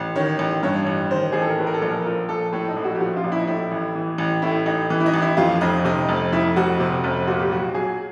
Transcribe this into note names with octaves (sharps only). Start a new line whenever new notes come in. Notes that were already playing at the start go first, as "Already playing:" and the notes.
Already playing: A1
D#3 C#5
A1
G2 C#5
A1
D#3 C5
A1 G#4
A4
A#4
A2 B4
A#4
A4
A#1
A#4
F3 A#4
A#1 A4
A2 A4
D#4
A#1
F#4
G4
F3 F#4
F4
A#1
E4
D#4
A2 E4
A1
E3
A1
A2 E4
A1 D#4
E3
E4
D#4
A1
E4
F2 F4
F1 D#4
C3 D#4
F1
F2 E4
F1 F#4
C3
F1
A#2 F#4
G4
B1 F#4
F#3 G#4